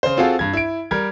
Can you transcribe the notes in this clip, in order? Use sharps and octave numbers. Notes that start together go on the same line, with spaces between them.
C#3 C5
C4 F4 F#4 G#4 A4 F5
G2 G#6
E4 D7
G3 A#4 G#6